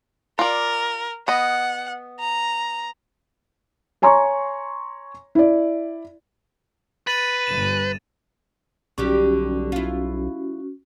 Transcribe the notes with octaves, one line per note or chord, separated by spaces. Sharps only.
F4 A#4 D5
B3 D#5 F#5
A#5
C#5 G#5 A#5 C6 C#6
E4 D5
B4 A6 D#7 F#7
G1 E7
B1 D3 G3 C#4 F#4 G4
E4 F4